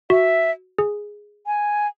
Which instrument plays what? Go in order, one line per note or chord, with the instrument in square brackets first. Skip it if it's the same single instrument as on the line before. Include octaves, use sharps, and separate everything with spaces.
[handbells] F#4 [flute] E5
[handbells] G#4
[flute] G#5